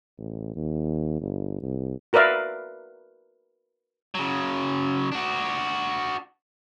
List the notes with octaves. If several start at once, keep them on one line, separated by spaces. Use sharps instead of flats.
A1
D#2
G1
C2
F#4 A#4 B4 D5 E5 F5
C#3 F#3
D4 F#4